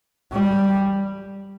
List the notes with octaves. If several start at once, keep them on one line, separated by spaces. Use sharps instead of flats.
G3